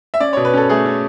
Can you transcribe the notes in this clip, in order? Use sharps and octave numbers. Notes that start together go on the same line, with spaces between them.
E5
C#4 D5
B2 C#5
B4
C#4 A4
A3 G#4
C#4